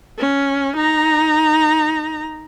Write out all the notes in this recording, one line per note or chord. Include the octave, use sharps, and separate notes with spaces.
C#4
D#4 A#5